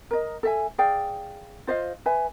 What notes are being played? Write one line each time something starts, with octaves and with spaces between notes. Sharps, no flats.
A#4 D#5
A4 E5 G#5
G#4 D5 F5 G5
F4 C5 D#5 F5
B4 E5 G#5